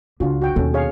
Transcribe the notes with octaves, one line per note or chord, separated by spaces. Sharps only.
C#2 D4 F4 F#4
F#4 G5
D#2 B2 C#4 A4
G#4 C#5 F5